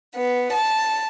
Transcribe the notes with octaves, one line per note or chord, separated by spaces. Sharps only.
B3
A5